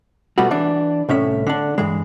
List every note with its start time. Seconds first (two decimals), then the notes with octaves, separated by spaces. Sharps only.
0.38 B2 G3 A3 B3 F#4
0.51 E3 D4
1.09 C2 A2 C#4 E5
1.47 D3 D4
1.78 G2 E3 G#3